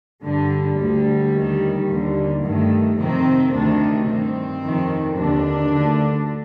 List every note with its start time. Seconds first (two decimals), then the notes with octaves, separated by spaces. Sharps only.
0.24 G2 D3 G3
0.79 D2 D3
1.34 D#2 D#3
1.88 D#2 D3
2.44 G2 D#3 A3
2.98 F2 C3 D#3 C4
3.52 D2 C3 D#3 D4
4.08 G2 D#3 C4
4.63 F2 C3 D#3
5.17 D#2 D3 D4
5.71 D2 D3